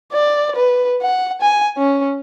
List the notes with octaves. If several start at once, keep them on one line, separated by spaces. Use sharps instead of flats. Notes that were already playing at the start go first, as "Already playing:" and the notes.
D5
B4
F#5
G#5
C#4